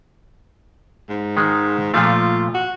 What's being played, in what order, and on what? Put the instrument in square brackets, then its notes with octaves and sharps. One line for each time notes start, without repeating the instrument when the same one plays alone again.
[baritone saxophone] G#2
[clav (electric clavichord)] D#3 G#3
[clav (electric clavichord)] A#2 F3 A3 [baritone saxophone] F4
[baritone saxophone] F#4